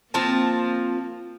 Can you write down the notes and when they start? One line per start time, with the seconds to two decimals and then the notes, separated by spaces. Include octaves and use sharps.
0.14 F3 A#3 C4 A5